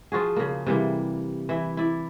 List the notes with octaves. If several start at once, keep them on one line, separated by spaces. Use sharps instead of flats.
F3 F4 F#4 G#4
C#3 A#3
C3 E3 G3 A#3
E3 E4
E4 D5